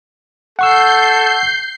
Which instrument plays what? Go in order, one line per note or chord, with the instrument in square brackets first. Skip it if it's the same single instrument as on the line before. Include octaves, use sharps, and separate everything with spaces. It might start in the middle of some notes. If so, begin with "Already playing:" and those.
[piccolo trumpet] A4 [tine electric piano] F#5 C#6 E6 [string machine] G6 C7